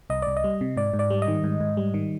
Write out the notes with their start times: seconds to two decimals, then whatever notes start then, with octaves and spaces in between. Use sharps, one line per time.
0.10 C2 D#5
0.22 C2 D5
0.37 D#5
0.44 G3
0.61 C3
0.77 G#2 D5
0.94 G#2
0.99 D5
1.10 G3
1.22 D#5
1.28 D#3
1.44 G#2
1.60 G#2
1.77 G3
1.94 D#3